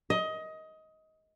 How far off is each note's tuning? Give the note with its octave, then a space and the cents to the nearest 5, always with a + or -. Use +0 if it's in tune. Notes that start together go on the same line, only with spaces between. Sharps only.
D#5 +20